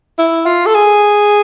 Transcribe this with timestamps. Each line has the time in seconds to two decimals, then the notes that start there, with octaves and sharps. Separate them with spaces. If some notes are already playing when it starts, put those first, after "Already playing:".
0.19 E4
0.46 F4
0.66 A4
0.74 G#4